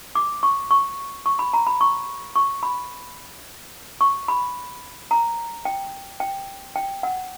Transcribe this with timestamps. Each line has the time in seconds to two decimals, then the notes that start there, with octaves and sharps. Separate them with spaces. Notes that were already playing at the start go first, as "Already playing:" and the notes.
0.15 D6
0.43 C#6
0.71 C#6
1.26 C#6
1.39 B5
1.53 A#5
1.67 B5
1.81 C#6
2.36 C#6
2.63 B5
4.01 C#6
4.28 B5
5.11 A#5
5.65 G5
6.20 G5
6.76 G5
7.03 F#5